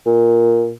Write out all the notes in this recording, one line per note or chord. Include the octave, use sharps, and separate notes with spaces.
A#2